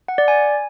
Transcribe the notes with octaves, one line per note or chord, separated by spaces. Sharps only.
F#5
D5
G#5